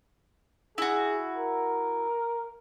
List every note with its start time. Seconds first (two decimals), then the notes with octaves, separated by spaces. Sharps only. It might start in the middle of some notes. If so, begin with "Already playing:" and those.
0.78 E4 F#4 G#4
1.37 A#4